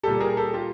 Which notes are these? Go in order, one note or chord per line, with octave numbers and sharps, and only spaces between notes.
A#2 G3 G4 A4
G#4 A#4
G4 A4
F4 G4